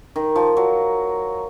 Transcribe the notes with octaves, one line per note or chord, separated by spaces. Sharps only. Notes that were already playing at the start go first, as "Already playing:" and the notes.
D#3
F3
F#3